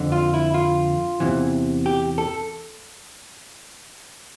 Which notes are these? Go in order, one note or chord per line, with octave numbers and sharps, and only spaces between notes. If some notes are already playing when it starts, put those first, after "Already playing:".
Already playing: F2 D3
F4
E4
F4
E2 C3 E3
G4
A4